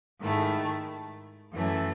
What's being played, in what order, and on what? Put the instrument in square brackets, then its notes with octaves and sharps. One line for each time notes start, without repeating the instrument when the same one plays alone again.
[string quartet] G#2 D#3 A3 E4
F#2 E3 A3